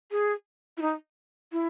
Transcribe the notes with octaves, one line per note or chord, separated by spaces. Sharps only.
G#4
E4
D#4
E4